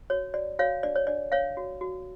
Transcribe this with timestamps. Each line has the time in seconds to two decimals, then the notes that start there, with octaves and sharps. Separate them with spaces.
0.10 F#4 C#5
0.34 F#4 D5
0.59 F#4 C#5 F5
0.83 D4 D5
0.96 C#5
1.07 D4 D5
1.32 C#5 F5
1.57 F#4
1.81 F#4